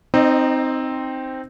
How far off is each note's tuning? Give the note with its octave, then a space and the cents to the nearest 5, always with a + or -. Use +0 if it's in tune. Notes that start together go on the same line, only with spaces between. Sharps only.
C4 +0 D#4 +0 D#5 -35